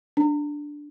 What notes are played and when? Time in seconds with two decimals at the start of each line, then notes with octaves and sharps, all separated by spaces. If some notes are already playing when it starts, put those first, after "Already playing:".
0.17 D4